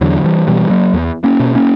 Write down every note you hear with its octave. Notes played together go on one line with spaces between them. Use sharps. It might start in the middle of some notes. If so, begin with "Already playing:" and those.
E2 D3 F#3
E3 G3
B2 E3 G3
F#3 A#3
E2
A#3 C#4
B2
A#3 C#4